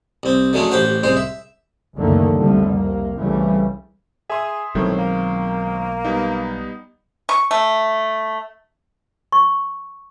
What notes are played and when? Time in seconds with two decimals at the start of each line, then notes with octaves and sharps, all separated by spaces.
0.23 C2 C4
0.53 D3 F#3 G#3 A3 C#4
0.71 A1 G4 C5 F#5
1.03 C2 G#3 C5
1.17 E5
1.96 C#2 F#2 D3 D#3 A3 A#3
2.36 C2 F2 D3 F3 G3 A3
2.71 C2 A#3
3.16 C2 C#3 E3 G3 A3
4.30 G#4 E5 C6 D#6
4.75 B1 A2 D#3 F#3 G#3 C4
4.98 A#3
6.05 G3 B3 D#4
7.29 C#6
7.51 A3
9.32 C#6